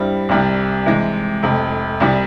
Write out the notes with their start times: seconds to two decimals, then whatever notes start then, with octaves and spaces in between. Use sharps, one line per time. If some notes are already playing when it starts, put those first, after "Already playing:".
Already playing: G2 G3 C4 E4
0.29 C2 C3 G3
0.86 C3 E3 G#3
1.43 F1 F2 C3
2.00 C2 C3 G3